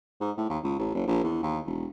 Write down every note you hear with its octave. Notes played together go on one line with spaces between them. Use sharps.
G#2
A2
D#2
C#2
A1
F#1
A#1
E2
D#2
E1